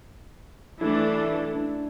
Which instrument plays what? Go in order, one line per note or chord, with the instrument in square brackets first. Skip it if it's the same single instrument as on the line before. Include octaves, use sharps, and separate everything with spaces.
[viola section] E3 A3 D4 A4 [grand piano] E4
[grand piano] E4
D4